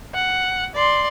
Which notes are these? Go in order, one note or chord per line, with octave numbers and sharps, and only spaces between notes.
F#5
D5 C6